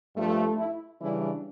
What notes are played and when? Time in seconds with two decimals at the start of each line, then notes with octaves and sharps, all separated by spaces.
0.16 G2 F3 A3
0.58 E4
1.00 C#3 E3 G3 D4 E4